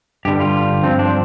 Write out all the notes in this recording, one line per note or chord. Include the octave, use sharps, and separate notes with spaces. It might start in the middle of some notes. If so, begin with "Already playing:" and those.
G2 D3 G3 G4
F4
G2 F3 C4
D4